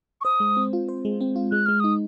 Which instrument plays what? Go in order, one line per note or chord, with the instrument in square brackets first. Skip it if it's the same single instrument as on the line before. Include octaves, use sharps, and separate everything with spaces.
[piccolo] C#6
[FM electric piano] C5 [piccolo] D#6
[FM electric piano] G#3
C4
F4
C5
G#3
C4
F4
[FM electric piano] G#3 [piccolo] F#6
[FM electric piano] G#3 [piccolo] F6
[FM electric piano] D#4 [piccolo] D#6